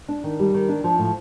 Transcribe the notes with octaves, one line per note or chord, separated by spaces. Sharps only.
D4
D#3
G3
D#3
D4
F3
A2